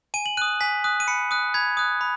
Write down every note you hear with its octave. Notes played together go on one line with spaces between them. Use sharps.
G#5 D#7
F#7
D#6 F#6 D#7
G#5 B6
D#6 F#6
D#7
B5 C#7
D#6 F#6
B5 G#6
D#6 F#6
B5